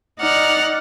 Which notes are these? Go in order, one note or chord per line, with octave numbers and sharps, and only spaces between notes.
D#4 D5 F#5 F6